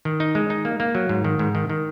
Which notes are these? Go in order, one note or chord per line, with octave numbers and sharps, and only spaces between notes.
D#3
D#4
G#3
D#4
A#3
A#3
F#3
G#2
D#3
G#2
D#3
D#3